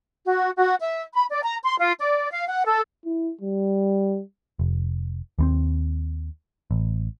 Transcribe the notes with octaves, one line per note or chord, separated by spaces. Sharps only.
F#4
F#4
E5
B5
D5
A#5
C6
F4
D5
F5
F#5
A4
E4
G3
F1
D#2 B3 C4
A1